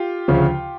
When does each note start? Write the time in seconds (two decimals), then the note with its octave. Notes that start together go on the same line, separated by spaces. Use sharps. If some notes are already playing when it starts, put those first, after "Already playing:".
Already playing: F4 G4
0.28 D2 C#3 F3